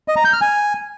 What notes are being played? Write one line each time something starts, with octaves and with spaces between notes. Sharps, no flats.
D#5
A#5
G6
F6
G#5